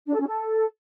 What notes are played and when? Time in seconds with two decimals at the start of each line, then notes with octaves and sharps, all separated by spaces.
0.08 D4
0.14 A4
0.21 C#4
0.27 A4